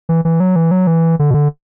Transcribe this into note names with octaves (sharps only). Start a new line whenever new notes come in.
E3
E3
F#3
E3
F#3
E3
D3
B2
D3